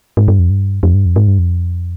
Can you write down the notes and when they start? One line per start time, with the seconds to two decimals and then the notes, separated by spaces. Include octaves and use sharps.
0.17 G#2
0.28 G2
0.39 F2
0.50 G2
0.83 F2
0.94 G2
1.06 F2
1.16 G#2
1.28 G2
1.39 F2